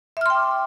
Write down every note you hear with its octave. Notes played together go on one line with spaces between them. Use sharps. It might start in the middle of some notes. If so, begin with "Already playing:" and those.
E5 G5 C6 D6 F6